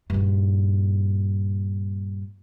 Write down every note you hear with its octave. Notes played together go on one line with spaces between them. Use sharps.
G2 A#2